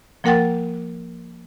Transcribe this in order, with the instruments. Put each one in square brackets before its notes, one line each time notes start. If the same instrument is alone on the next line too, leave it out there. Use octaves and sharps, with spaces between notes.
[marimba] F3 A#3 A#4 F#5 G5 A6